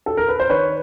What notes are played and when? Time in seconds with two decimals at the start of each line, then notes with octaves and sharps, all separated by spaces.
0.06 A4
0.17 A#4
0.28 B4
0.40 C5
0.50 D#3 B4 C#5